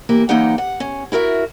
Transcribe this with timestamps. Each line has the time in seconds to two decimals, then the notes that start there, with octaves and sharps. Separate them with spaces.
0.09 E3 A#3 E4 G4
0.29 F#2 E3 A#3 D#4 G4 F#5
0.58 F#5
0.80 C#4
1.12 E4 F#4 A#4 E5